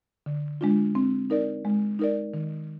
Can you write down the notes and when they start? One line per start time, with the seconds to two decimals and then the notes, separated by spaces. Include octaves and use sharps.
0.26 D3
0.61 G#3 D4 F4
0.95 C4
1.30 D#4 A#4 D5
1.65 G#3
1.99 D#4 A#4 D5
2.34 D#3